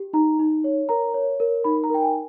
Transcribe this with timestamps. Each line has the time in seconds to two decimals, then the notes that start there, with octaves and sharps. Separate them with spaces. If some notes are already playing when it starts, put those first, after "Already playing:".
Already playing: G4
0.13 D#4 A#5
0.39 D#4
0.64 C#5
0.89 A#4 A#5
1.14 C#5
1.40 A#4
1.64 D#4 B5
1.84 A#5
1.90 A#4 G5
2.03 G#5